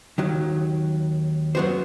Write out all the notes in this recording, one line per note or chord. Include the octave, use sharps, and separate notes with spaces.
D#2 D#3 F#3
F#2 F#3 B3 F#4 C5